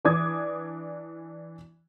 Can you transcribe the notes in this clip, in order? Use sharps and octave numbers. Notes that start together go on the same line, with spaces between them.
E3 D4 D6 D#6 G#6